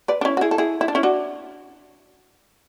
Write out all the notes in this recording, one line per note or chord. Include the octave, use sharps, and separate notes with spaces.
B4 D5
D4
C#4 E4
F#4
E4 G#4
A4
E4 G#4
E4
D4
C#4 E4
D4 F#4